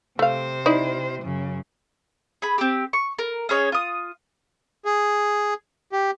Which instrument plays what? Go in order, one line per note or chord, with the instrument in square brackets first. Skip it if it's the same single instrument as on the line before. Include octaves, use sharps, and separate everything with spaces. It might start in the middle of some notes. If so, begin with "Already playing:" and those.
[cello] C3 C5 [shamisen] A3 F5
[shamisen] D#4 E4 D5
[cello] F#2 C#3
[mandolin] G#4 B5
C4 G4
C#6
A#4
C#4 G#4 C#5 D#5
F4 D#6
[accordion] G#4
G4